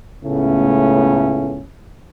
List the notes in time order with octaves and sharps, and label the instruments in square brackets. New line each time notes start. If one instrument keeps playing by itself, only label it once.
[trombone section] C#2 A2 C#3 A3 B3 C#4